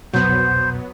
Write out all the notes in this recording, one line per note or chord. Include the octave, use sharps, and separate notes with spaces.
C2 F2 B2 F#3 B3 C5